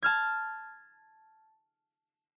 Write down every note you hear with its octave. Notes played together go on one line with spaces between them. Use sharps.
A5 F6 G#6